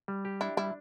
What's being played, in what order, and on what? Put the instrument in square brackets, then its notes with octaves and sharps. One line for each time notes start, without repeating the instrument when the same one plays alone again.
[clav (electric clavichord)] G3
G4
[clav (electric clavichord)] D4 [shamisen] E4
[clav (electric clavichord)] G3 [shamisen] E4